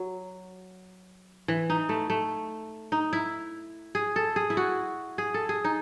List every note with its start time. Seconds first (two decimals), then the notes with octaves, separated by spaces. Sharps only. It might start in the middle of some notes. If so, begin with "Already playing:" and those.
Already playing: F#3
1.48 E3
1.70 D#4
1.89 A3
2.10 A3
2.92 D#4
3.13 E4
3.95 G#4
4.16 A4
4.36 G#4
4.50 E4
4.57 F#4
5.18 G#4
5.34 A4
5.49 G#4
5.64 D#4